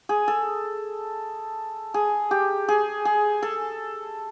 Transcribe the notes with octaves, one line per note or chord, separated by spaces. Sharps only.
G#4
A4
G#4
G4
G#4
G#4
A4